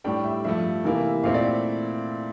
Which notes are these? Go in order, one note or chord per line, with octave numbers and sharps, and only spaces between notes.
A2 G3 D4 G5
E5
G2 F3 A3 E5
C3 E3 A#3 E4
A#2 A3 C4 E4 F5
D5